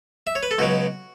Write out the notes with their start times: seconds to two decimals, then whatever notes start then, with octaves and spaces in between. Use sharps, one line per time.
0.27 E5
0.35 C#5
0.43 B4
0.51 A4
0.58 C#2 B2 F#3 F#4